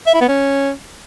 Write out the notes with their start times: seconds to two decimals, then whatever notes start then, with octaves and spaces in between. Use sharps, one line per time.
0.07 E5
0.14 E4
0.21 B3
0.28 C#4